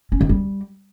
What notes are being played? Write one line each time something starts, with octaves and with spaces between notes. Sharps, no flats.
C#4
D#3
G3